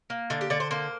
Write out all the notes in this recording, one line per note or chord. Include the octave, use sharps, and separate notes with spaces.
A#3
D3 D5
G4
D3 D5
C5
A#3 C5